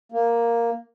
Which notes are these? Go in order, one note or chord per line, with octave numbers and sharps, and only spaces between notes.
A#3